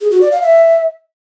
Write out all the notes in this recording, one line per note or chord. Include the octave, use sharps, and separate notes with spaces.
G#4
F#4
D5
F5
E5